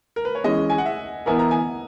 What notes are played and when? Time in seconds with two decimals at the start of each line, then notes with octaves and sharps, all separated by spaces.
0.16 A#4
0.25 B4
0.35 C#5
0.44 E3 G#3 C#4 D#5
0.70 G#5
0.78 F#5
0.86 E5
1.26 E3 B3 E4 A#4 G#5
1.39 A#5
1.51 G#5